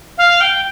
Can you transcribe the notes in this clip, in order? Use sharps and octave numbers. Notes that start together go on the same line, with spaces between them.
F5
G5